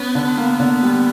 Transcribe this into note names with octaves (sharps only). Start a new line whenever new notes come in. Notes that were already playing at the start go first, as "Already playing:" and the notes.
Already playing: B3 C#4
D3
A#3
D3
G3